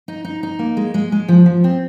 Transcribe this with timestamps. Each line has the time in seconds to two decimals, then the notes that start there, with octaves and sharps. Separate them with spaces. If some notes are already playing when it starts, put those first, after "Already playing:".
0.08 D#4
0.24 D#4
0.43 D#4
0.59 A#3
0.77 G#3
0.94 G#3
1.12 G#3
1.28 F3
1.46 F3
1.64 C4